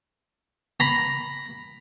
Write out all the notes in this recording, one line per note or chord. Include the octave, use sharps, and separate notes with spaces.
A#5 B5